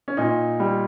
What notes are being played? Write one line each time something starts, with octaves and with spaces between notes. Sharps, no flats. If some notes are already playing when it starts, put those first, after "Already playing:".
C#4
A#2 D#4
G3